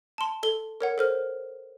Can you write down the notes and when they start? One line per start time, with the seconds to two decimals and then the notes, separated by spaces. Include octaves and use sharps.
0.18 A5 C6
0.43 A4 G7
0.81 A#4 C#5 F#5
0.98 A4 C5 F6